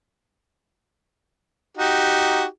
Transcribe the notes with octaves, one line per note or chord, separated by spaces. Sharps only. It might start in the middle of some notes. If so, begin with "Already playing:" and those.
D#4 F#4 G4